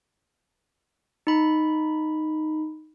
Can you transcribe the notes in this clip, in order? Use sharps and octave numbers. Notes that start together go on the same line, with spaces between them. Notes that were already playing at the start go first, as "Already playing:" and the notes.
D#4 B5